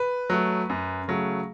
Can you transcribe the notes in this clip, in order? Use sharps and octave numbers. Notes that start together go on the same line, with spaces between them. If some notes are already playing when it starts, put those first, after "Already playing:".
Already playing: B4
F#3 A3
F#2
C#3 F#3 A3